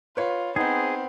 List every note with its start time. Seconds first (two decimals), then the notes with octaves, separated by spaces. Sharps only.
0.17 F4 B4 C#5
0.56 B3 C4 D#4 G#4 C5